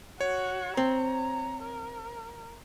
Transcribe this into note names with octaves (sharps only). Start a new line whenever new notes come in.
F#4 C#5
C4 A#5
A#4